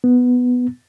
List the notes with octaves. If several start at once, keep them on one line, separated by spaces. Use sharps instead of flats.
B3